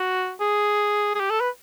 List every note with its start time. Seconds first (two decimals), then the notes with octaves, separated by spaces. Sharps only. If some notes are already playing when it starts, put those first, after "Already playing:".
Already playing: F#4
0.40 G#4
1.15 G#4
1.20 G4
1.30 A4
1.40 B4